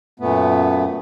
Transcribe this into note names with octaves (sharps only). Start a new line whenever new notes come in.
F#2 A#2 A3 B3